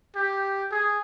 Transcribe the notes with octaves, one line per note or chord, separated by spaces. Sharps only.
G4
G#4